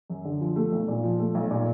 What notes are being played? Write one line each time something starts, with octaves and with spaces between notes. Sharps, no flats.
F#2
D3
F3
A3
B1
A#2
F3
A3
B1
A#2